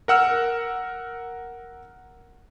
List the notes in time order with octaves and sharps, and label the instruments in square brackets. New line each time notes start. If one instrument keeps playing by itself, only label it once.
[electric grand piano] A#4 F#5 E6 F6